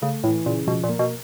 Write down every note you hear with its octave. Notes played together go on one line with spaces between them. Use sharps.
C#3 A3
A2 E3
A#2 C#3
B2 F3
A#2
A#3
B2